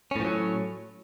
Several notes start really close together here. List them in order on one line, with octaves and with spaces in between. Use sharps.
C#4 A2 F3 F#3